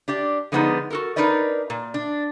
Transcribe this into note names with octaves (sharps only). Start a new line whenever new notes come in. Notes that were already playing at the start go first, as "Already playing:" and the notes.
D4 G4 D5
D3 F3 G#3 B3 C#4 D#4
F#4 A4 A#4
D4 D#4 A#4 B4 D5 D#5
A#2
D4